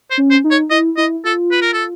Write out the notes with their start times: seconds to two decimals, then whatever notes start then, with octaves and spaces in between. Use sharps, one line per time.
0.11 C5
0.18 C#4
0.31 C5
0.44 D#4
0.51 C#5
0.70 E4 D#5
0.97 E4 D#5
1.25 F4 A4
1.51 B4
1.61 A#4
1.73 A4